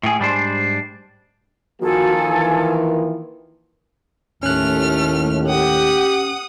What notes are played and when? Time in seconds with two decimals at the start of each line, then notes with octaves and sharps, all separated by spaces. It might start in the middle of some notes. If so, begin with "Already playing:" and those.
0.03 A2 G#4
0.19 G#2 G3 D4 C5
1.81 D#3 F3 A#3 F#4 A4 G#5
2.30 E3
4.43 D#2 A2 A3 C#4 F6 F#6
5.47 G4 F#5 D#6